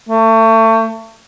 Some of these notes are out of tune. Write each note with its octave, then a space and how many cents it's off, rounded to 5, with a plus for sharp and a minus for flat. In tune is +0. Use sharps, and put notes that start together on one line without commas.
A3 +30